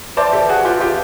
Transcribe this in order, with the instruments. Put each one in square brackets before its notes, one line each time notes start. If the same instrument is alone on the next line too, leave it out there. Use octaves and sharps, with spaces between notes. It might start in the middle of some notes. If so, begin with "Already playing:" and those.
[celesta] B4 E5 A5 [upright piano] C5 D5
[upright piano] G4 A4
F#4 G#4
F4 G4
F4 G4